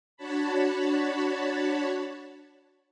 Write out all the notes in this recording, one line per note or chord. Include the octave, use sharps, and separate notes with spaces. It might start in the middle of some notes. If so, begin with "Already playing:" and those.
D4 F#4 C#5 A5 B5